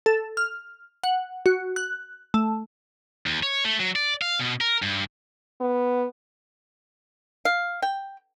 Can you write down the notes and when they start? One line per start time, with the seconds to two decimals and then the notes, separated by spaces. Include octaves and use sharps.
0.06 A4
0.37 F6
1.03 F#5
1.46 F#4
1.76 F#6
2.34 A3
3.26 D#2
3.43 C#5
3.65 A3
3.80 F#3
3.96 D5
4.22 F5
4.39 B2
4.61 A#4
4.82 G2
5.61 B3
7.45 F5
7.82 G5